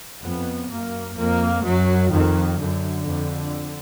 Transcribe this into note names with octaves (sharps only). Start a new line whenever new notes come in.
F2 B3
F#2 A#3
F2 A#3
F#2 F#3
F2 D#3
F#2 D3
F2